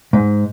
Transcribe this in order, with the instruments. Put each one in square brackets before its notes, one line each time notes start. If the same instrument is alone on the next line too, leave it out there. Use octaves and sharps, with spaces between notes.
[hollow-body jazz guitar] G#2